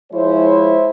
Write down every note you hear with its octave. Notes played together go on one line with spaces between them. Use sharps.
F3 G#3 E4 C5 C#5